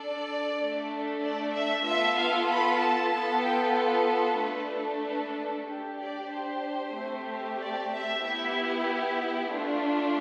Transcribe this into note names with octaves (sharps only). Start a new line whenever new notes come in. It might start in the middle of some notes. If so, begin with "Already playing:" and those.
Already playing: D4 A4 D5
A3 D4 A4
D5
E5
B3 F4 A4 E5
F5
B5
A5
B3 F4 A4 A5
G5
B4
A3 D4 A4
B4
D4 G4
D5
C5
A3 C4 G4
D5
E5
B3 E4 G4 E5
A3 D4 F4